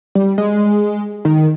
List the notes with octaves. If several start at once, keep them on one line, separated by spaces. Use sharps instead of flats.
G3
G#3
D#3